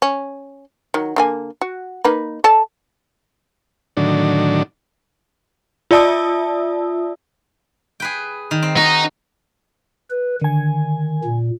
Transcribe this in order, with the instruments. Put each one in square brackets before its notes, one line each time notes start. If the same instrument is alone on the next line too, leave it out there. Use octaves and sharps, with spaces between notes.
[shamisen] C#4
D#3 F#3
D3 A#3 G#5
F#4
A#3 D#4 B4
A4 D5 A5
[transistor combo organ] A2 D3 D#3 F#3 D4
[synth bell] F4 D5 E5 A5 D#6 E6
[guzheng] G#4 B4 G5
D#3
C4
[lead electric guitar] D#4 [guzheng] F#4
[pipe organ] B4
[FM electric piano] D3 G#5 [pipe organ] D#3
[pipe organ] A#2